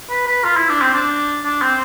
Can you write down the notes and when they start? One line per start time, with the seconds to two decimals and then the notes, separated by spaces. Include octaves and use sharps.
0.10 B4
0.27 B4
0.44 F4
0.56 E4
0.69 D4
0.82 C4
0.94 D4
1.45 D4
1.62 C4